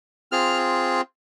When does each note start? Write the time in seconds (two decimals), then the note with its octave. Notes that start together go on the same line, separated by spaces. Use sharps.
0.32 C4 F4 G#4 F6